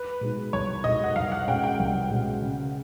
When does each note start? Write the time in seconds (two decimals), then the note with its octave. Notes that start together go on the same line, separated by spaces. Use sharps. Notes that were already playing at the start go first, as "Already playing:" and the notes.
Already playing: B4
0.21 B2 G#3 B3 D#4
0.53 C2 C#5
0.84 B2 G#3 B3 D#4 D#5
1.04 F#5
1.16 C2 F5
1.32 F#5
1.48 B2 G#3 C#4 G5
1.64 G5
1.79 C2
2.11 B2 G#3 C#4
2.42 C#3